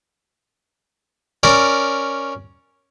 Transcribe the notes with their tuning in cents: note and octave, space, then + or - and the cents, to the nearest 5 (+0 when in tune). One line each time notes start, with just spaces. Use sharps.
C#4 +0 A#4 -5 D5 +0